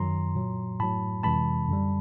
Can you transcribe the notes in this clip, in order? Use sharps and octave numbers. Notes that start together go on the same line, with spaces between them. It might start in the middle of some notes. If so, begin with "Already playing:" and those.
Already playing: F#2 D#3 F#3 A#5 C6
A#2 F#3
A2 F#3 A5 B5
F2 C3 E3 G#3 A5 B5
F#2 D3 G3